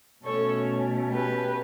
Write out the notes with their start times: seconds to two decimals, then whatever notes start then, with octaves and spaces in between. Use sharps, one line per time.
0.24 B2 A3 C#4 A4 C#5
1.11 G4 B4